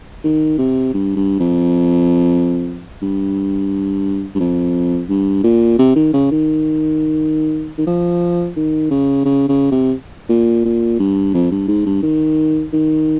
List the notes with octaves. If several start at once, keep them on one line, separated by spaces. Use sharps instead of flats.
D#3
C3
G2
G2
F2
G2
G2
F2
G2
A#2
C3
D#3
C#3
D#3
D#3
F3
D#3
C#3
C#3
C#3
C3
A#2
A#2
G2
F2
G2
G#2
G2
D#3
D#3